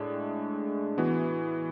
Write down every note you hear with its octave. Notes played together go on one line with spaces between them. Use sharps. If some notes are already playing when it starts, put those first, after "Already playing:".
Already playing: A2 G#3 D4 G#4
E3 B3 F#4